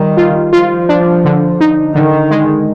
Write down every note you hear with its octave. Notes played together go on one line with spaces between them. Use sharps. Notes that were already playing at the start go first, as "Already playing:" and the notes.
Already playing: D#3 G3
F4
F3 F4
D4
D3
D#4
D3 D#3
G#3